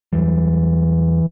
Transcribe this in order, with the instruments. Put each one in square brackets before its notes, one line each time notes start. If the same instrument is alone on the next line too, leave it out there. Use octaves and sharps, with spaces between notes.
[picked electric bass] E2 F#3 G3 [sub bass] E3